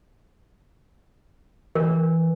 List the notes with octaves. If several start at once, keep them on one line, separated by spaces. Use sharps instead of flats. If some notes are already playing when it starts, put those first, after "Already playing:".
E3 A#4